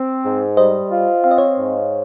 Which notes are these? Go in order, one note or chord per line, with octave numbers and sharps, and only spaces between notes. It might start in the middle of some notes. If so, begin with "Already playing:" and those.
Already playing: C4
G#2
G3 C5 D#5
F4
C4 F5
D#5
C#5 F5
G#2